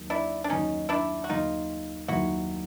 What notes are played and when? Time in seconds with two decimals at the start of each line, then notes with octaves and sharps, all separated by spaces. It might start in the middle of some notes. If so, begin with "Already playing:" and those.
Already playing: D#2 D#3 F#3
0.10 D4 E4
0.44 D4
0.50 D#2 D#3 F#3 C#4 D#4
0.89 D4 E4
1.24 F#4
1.29 D#2 D#3 F#3 D#4 F4
2.08 D#2 D#3 F#3 E4 F#4